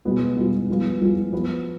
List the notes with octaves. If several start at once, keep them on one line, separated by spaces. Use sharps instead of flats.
B2 G#3 B3 F4
B2 G#3 B3 F4
F3 G#3 B3 F4
F3 G#3 B3 F4
F3 B3 F4 B4